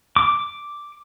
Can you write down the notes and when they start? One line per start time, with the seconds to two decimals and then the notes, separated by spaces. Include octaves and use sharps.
0.16 D6